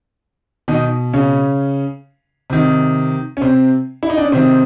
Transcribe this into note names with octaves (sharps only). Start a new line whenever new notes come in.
B2 D#3 D#4
C#3 C#4
C3 D#3
C#4
C3 C4
E4
D#4
D4
C#4
C3 D#3 C4